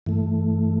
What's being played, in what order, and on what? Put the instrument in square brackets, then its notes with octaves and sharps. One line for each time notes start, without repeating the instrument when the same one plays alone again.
[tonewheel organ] G2 E3 A3